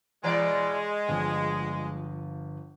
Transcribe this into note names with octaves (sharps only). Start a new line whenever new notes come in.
B2 E3 G#3 D5
G1 F3 F#3